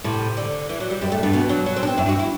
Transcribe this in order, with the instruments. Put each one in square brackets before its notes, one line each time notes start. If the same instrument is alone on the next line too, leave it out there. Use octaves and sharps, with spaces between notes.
[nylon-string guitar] A2 [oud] C3
[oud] D3
E3
F#3
G3
[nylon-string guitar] F#2 [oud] G3
[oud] A3
[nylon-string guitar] G2 [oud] B3
[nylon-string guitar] B2 [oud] B3
[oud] F#3
F#3
C4
D4
C4
[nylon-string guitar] F#2 [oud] E4
[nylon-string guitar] G2
[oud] F#4
E4